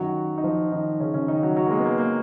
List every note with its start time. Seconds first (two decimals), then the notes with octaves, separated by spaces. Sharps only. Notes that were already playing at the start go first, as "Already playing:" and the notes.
Already playing: F#2 D#3 F#3 F#4
0.38 D#4
0.44 F3 F4
0.72 D#3 D#4
1.00 C#3 C#4
1.14 C#3 C#4
1.28 D#3 D#4
1.43 F#3 F#4
1.56 F#3 F#4
1.66 A#3
1.71 G#3
1.79 B3
1.85 A#3
1.98 A#3